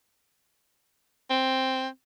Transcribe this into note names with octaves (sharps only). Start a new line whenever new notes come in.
C4